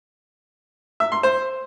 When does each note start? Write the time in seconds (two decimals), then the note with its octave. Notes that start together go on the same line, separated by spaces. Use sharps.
1.00 E5
1.12 C6
1.23 C5